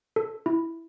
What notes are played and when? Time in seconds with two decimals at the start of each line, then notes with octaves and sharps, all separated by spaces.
0.16 A4
0.46 E4